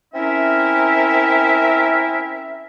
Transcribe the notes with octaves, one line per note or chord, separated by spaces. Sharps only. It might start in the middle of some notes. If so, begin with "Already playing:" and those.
C4 C#4 E4 A#4 E5